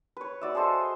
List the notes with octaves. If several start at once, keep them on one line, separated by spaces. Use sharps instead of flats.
B4 C#5
F#4 D5 E5
G#4 A4 C5 D#5